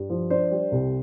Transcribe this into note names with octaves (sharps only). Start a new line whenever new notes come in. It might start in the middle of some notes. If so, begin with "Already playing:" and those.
Already playing: G2
F3
D4 C5
G3
C2